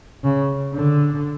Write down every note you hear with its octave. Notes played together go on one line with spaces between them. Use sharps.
C#3
D3